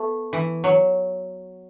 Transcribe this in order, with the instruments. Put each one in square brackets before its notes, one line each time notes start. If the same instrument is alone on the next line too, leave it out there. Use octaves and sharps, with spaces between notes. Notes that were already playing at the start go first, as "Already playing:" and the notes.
Already playing: [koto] A3 B3
E3
F#3